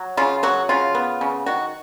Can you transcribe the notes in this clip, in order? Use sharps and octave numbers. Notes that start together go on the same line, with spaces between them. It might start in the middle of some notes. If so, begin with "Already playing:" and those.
Already playing: F#3
C#3 F4
F#3 F#4
C#3 F4
B3
C#3
D#3 F#4